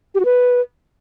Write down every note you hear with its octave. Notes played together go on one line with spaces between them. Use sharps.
G4
F#4
B4